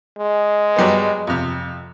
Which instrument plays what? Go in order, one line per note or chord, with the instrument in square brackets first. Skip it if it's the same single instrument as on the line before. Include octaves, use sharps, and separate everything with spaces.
[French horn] G#3
[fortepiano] F#3 G3 B3
F2 C3